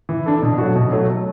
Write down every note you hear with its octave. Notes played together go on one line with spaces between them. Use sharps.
E3
D4 A4
B2
F#3 A3 F#4
B2
F#3 A3 F#4